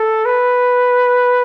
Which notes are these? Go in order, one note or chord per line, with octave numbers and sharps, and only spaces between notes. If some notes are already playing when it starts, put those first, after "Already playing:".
Already playing: A4
B4